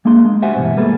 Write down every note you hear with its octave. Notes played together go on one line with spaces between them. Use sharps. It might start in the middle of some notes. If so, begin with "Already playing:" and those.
G#3 A#3 D4 G#4 C6
G#3
F#4 G4 C5 E5 F#5 G#5
G2 B2 E3
G3 G#3 A#3 G#4 A4 B4